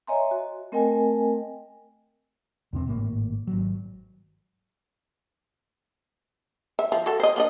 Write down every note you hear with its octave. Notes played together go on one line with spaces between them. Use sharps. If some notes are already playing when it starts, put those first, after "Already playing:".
C#5 D#5 E5 G#5 A#5 C6
F#4
A3 C4 A#4 D#5 G5 G#5
E2 C3 C4
G#1 A2 A#3
G#1 F#3
E5
F3
F#4 A4
C5 D#5
A#3 D4 D#5